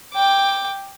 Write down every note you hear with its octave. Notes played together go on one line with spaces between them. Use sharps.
G5 D6